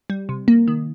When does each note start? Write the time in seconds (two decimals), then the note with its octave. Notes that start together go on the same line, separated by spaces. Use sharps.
0.10 G3
0.29 C3
0.48 A#3
0.68 D#3